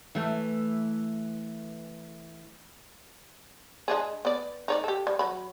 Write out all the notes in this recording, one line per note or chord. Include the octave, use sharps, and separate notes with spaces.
E3 A3
G#3 D4 G#4
B3 D5
D#4 C#5 D5
G4 A4
G3
F#3 B5